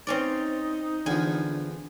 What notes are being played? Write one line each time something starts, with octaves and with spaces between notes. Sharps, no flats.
C4 C#4 D#4 D5
E2 D3 F3 G#5